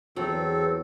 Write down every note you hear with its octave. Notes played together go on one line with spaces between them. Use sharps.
E2 F#3 C4 A4